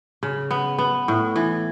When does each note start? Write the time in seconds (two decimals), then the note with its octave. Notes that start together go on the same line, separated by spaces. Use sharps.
0.23 C#3
0.51 B3
0.78 B3
1.08 A2
1.36 E3